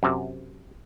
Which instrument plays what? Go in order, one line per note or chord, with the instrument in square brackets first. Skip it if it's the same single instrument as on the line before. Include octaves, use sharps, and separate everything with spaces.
[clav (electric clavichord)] F#2 C3